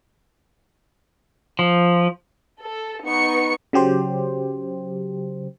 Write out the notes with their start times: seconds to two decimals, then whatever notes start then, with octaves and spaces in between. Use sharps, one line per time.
1.59 F3
2.62 A4
3.05 B3 D#4 C#6 C#7
3.73 C#3 F#3 G4 C5